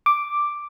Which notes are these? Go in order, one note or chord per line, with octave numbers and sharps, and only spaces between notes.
D6